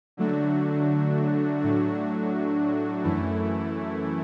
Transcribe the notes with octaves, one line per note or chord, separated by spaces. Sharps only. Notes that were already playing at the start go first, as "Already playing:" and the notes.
D3 F#3 A3 D4 F#4
A2 F#3 A3 D4 F#4
F#2 E3 A3 E4